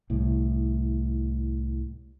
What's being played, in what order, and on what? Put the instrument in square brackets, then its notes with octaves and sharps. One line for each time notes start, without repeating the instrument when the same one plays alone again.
[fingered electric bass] C2 A2